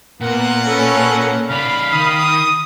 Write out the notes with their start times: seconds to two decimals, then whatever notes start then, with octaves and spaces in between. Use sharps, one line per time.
0.21 A#2 A#3 B3 A#4 F#5
0.66 C#4 A4 B4
1.50 C#3 D5 F5 B5
1.92 D#3 D#6